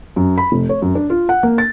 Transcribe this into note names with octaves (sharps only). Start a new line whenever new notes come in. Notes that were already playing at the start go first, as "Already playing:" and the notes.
F#2
B5
F1
C#5
F#2
D4
F4
F#5
A#3
A6